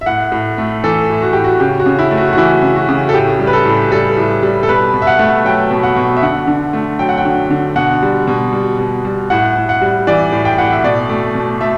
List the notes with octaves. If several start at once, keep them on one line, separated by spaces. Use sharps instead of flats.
E5
A2 F#5
A2
A3
E3 A4
A2
F#4
A2 G4
F#4
C#3 G4
F#4
C#3
E4
A3
F#4
F#4
E3 E4
C#3
F#4
C#3
A4
A2 G4
G3
B4
A4
A2
G3 A4
A2
G3
A4
B2 B4
B2
E5
F#5
A3
F#3 G5
B2
F#5
B2
E5
D3 F#5
D3
A3
F#3 G5
F#5
G5
D3
D3
B2 F#5
G3
B2
G3
B2
G3
A2 F#5
A2
F#5
G3
E3 D5
A2
G5
A2 F#5
E5
B2 D5
A3
B2
A3 E5